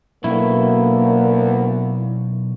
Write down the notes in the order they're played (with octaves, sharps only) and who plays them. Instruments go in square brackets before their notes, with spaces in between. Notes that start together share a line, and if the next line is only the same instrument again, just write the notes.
[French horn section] D2 B3 [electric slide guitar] B2 F#3 C#4 [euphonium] A#3 [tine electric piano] E4